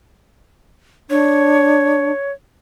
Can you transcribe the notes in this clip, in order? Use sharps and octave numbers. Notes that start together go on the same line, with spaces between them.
D4 C#5